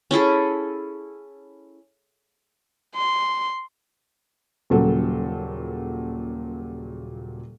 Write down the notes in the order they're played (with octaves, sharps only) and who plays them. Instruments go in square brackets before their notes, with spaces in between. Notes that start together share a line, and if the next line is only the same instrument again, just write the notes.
[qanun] C#4 E4 G#4 A4
[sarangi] C6
[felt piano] D#1 A#2 C#3 F#3 A4